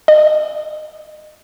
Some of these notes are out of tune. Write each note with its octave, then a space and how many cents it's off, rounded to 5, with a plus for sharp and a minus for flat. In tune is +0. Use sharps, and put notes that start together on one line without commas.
D#5 -30